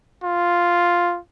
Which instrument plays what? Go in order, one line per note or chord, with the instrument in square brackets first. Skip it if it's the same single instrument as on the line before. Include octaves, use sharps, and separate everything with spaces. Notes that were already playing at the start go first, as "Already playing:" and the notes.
[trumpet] F4